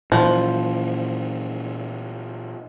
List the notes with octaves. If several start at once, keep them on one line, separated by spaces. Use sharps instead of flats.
A#2 E3 F3